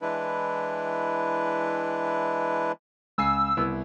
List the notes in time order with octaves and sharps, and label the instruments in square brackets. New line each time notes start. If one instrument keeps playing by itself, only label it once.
[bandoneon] E3 G#3 D4 E4 B4
[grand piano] C#2 G#5 C7 [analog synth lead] E6
[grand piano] C2 B3 E4